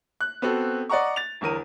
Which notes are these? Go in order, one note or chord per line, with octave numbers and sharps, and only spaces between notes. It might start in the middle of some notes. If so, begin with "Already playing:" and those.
F#6
B3 C4 F#4 A4
D5 D#5 F#5 A#5 C#6
A6 F7
G1 E2 A#4 D#7